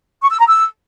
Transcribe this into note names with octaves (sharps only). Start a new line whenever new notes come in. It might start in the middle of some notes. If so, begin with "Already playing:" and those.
C#6
E6
A#5
E6